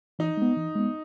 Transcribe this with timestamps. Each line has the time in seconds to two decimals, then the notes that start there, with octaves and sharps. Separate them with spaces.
0.19 E3 D#4
0.37 G#3 B3
0.56 E3
0.75 G#3 B3